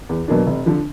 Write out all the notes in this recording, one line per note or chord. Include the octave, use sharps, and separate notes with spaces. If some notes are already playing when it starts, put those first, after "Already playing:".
E2
B2 F#3 A#3 D4
F1
D3 F3